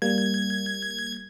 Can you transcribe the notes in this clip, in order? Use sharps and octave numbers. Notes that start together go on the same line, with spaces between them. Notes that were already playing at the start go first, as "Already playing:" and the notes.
G3 A#3 G#6